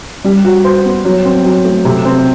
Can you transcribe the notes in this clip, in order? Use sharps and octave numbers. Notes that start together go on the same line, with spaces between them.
G3
F#4
C5
B3
F#3
C4
F#3
A3
C3
C4